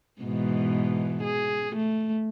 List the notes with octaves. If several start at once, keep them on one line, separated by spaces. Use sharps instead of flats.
G#2 B2 E3
G#4
A3